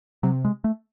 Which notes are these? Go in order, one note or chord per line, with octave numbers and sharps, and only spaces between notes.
C3 F#3
G#3
A3